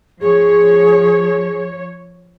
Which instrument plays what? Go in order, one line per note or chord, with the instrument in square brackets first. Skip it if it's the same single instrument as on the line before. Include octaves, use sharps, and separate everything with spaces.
[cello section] F3 C#5 [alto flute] G#4